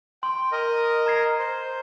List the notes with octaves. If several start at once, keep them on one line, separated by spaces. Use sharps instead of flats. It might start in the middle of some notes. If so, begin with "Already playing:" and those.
G5 C6
A#4 D#5
A#5 G#6 C7
C5